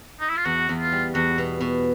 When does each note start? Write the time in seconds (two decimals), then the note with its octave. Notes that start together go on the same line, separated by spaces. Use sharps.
0.20 D#4
0.29 E4
0.37 F4
0.45 E2 F#4
0.69 E2
0.80 F4
0.92 G3
1.15 E2 F#4
1.38 B2
1.60 B2